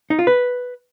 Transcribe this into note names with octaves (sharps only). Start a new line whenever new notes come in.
D#4
F4
B4